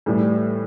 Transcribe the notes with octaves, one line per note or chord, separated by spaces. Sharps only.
A2 E3 G3